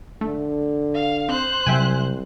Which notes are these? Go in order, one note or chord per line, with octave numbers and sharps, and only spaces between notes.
D3 A3
F5
C4 C5 F#6
C2 C3 F#3 E5 G5 G#5